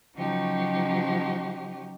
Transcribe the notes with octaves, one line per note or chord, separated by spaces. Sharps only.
C#3 F3 F#3 D#4 F#4 G4